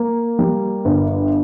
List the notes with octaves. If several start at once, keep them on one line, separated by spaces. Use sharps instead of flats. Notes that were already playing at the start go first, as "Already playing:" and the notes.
Already playing: A#3
G3
G1